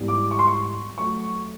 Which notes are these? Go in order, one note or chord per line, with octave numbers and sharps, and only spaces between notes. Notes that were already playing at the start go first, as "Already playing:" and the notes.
Already playing: G#2 E3 G3 B3
D6
C#6
C6
C#6
F#3 A3 C#6